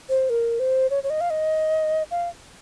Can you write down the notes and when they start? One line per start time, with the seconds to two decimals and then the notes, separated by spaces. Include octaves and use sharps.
0.10 C5
0.30 A#4
0.60 C5
0.90 C#5
1.04 C#5
1.10 D#5
1.21 F5
1.30 D#5
2.11 F5